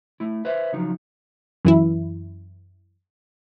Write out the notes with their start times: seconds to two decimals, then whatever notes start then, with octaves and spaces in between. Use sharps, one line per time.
0.20 A3 E4
0.45 B4 C5 E5
0.73 C#3 F3 F#3 D#4
1.65 F#2 E3 E4